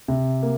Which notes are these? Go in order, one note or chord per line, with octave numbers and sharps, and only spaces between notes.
C3
A#3